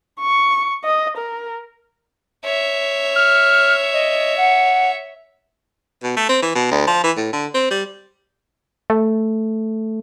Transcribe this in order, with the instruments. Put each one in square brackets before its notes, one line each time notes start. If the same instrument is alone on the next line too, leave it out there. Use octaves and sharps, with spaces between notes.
[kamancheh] C#6
D#5
A#4
[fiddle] C#5 E5
[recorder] F6
D#5
F#5
[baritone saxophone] B2
A3
C4
E3
B2
D2
F3
E3
A2
D3
C4
G3
[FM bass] A3